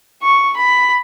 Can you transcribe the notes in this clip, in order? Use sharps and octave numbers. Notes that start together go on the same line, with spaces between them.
C#6
B5